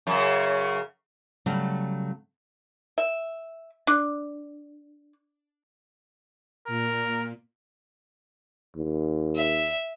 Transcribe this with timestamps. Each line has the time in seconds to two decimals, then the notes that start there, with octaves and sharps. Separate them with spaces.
0.07 F#2 C#3
1.46 C#3 F#3 G3 A3
2.98 E5
3.87 D4
6.67 A#2 A#4
8.76 D#2
9.35 E5